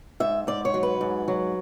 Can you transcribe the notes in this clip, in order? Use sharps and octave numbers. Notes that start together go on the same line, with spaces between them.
G#2 E5
G#2 D5
C#5
F#3
B4
G#2
F#3